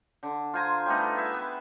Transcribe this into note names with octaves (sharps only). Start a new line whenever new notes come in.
D3
F4 C5 G#5 A#5
G3 A3 B3 D#4
G#4 B4 E5 G#5
B3